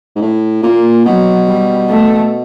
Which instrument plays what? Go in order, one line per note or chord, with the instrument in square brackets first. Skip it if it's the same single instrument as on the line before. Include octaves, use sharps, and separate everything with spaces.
[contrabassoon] G#2
A2
[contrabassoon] A#2 [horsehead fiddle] A#3
[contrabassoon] B2 [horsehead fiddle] F#3
[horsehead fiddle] G3
A3